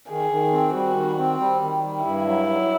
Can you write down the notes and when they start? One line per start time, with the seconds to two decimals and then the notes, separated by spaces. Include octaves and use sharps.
0.10 D#3 G#4
0.31 D#3
0.52 C4
0.74 G3 F#4
0.96 D#3
1.18 C4
1.40 G3
1.62 D#3
1.84 G3
2.05 G2 E4
2.26 F#3
2.48 F#3